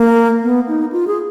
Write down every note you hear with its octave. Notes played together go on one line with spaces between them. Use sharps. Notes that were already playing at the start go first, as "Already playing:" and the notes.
Already playing: A#3
B3
D#4
F4
G#4